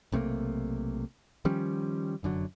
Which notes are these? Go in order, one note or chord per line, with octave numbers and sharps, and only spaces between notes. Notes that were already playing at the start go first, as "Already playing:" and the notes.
B1 C3 A3 A#3
D#3 F3 G3 C#4
F1 F#2 D3 F#3